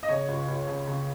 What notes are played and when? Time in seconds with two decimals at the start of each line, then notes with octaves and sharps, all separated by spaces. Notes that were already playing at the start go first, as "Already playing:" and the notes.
0.03 D#5
0.09 C#3 C#5
0.28 C#2
0.48 C#2
0.68 C#3
0.87 C#3